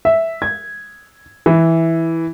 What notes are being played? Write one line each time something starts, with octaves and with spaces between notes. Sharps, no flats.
E5
G#6
E3